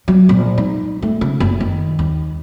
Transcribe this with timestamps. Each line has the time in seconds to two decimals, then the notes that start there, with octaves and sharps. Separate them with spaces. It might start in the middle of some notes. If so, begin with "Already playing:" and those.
0.08 F#3
0.29 A#1
0.58 D#4
1.02 A3
1.21 C#3
1.40 F#1
1.60 D#3
1.99 D#2